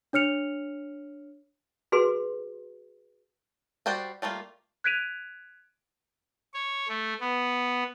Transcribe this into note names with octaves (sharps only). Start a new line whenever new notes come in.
D4 C#5 F6 C#7 F7
F#4 G#4 B4 C6
G3 F#4 C5 D5 G5
G3 A3 A#3 F4
F#6 G#6 B6 D7 D#7 F7
C#5
A3
B3